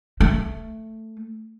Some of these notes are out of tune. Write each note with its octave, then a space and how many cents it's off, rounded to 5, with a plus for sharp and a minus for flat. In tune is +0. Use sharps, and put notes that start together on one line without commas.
A3 +10